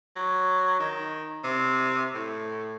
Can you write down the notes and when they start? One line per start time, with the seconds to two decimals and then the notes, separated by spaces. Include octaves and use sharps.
0.16 F#3
0.79 D#3
1.44 C3
2.14 A2